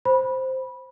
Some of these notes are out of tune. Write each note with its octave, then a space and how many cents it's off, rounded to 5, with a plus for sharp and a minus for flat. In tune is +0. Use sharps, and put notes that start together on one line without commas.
C5 +0 B5 -15